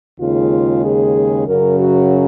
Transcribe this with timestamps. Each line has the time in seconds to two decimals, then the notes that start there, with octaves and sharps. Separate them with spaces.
0.19 D#2 C#3 G#3 F4
0.83 G#4
1.47 F#2 C#3 F#3 A#4
1.79 F#4